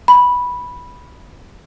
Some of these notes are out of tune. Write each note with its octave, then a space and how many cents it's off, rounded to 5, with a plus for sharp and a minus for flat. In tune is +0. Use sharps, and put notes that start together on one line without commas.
B5 -10